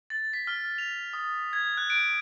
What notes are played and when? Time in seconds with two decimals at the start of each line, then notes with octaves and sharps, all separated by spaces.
0.10 A6
0.33 B6
0.47 F6
0.78 F7
1.13 D#6
1.53 G#6
1.77 F#6
1.90 D7